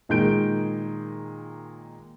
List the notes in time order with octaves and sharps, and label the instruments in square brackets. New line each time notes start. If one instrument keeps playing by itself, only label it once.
[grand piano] A#2 D#3 G#3 G6 D7